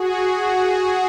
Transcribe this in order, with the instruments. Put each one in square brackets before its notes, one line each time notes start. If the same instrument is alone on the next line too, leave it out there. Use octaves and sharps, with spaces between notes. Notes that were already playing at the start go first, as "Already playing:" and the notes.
Already playing: [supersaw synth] F#4 G#4